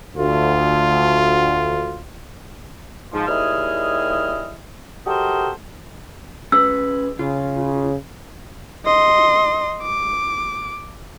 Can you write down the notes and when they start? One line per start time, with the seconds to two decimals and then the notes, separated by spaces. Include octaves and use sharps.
0.17 D2 F4
3.13 G#2 F3
3.27 D#2 G3 E4 G#4 D#5 F6
5.07 F#4 G4 A4 A#4 C5 D#5
6.52 C#4 G#4 B4 E6
7.19 C#3 F4
8.85 D#5 C6
9.83 D6